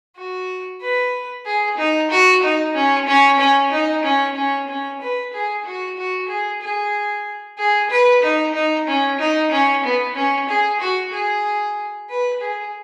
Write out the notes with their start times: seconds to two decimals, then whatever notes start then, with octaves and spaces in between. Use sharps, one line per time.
0.16 F#4
0.81 B4
1.46 G#4
1.77 D#4
2.11 F#4
2.43 D#4
2.74 C#4
3.07 C#4
3.39 C#4
3.71 D#4
4.03 C#4
4.35 C#4
4.68 C#4
5.01 B4
5.33 G#4
5.65 F#4
5.97 F#4
6.28 G#4
6.61 G#4
7.58 G#4
7.90 B4
8.22 D#4
8.54 D#4
8.87 C#4
9.18 D#4
9.52 C#4
9.84 B3
10.15 C#4
10.48 G#4
10.80 F#4
11.12 G#4
12.09 B4
12.41 G#4